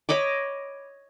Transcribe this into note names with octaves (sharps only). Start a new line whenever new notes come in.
C#5 D#5 B5 D6